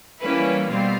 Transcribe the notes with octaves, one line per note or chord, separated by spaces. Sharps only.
E3 G3 A#3 C#4 E4 B4
B2 G3 C4 F4